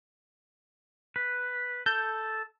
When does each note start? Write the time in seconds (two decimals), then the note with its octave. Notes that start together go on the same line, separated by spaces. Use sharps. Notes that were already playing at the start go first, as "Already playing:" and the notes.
1.16 B4
1.86 A4 G6